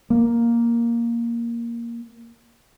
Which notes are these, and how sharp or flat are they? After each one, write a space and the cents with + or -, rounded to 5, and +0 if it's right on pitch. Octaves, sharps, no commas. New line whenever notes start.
A#3 +5